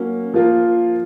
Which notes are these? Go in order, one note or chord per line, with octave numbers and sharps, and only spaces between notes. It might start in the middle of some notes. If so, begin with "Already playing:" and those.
Already playing: F#3 A#3 C#4
F3 A#3 F4 A#4